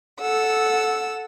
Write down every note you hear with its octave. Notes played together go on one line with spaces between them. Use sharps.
A4 F#5 E6